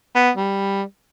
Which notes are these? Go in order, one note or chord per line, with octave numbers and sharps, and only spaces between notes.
B3
G3